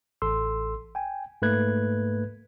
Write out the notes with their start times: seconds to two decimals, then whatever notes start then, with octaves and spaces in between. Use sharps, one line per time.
0.22 A1 A4 C6 E6
0.95 G5 G#5
1.42 G#2 A3 A#3 B4 F#6 G#6